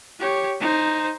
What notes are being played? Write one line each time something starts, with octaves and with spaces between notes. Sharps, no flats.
G4 C#5
D#4 C5